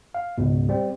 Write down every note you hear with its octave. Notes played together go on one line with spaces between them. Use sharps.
F5
C#2 G#2 B2
G3 C4